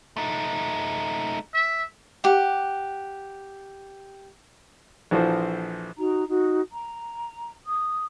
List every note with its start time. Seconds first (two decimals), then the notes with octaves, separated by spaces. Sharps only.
0.17 A3 D#4
1.54 E5
2.24 G4 F#5
5.11 A#1 E3 F3 F#4 A4 C5
5.98 D#4 F#4 A#5
6.28 D#4 F#4
6.72 A#5
7.66 D#6